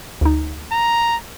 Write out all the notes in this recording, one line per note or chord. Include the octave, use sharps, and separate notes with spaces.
D2 D#4
A#5